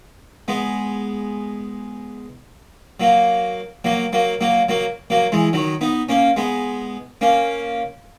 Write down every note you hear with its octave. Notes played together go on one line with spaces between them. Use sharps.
G#3 B3
F#3 A#3
F#3 A#3
F#3 A#3
F#3 A#3
F#3 A#3
F#3 A#3
E3 G#3
D#3 F#3
B3 D#4
A#3 C#4
G#3 B3
A#3 C#4